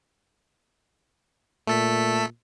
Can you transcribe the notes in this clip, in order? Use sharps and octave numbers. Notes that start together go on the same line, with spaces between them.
A#2 A3 A4 B6